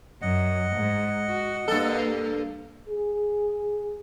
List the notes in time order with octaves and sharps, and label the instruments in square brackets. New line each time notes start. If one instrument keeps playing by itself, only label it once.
[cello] F#2 [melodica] D#5 F#5
[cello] G#2
F#4
[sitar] G2 A4 [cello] A#3
[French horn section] G#4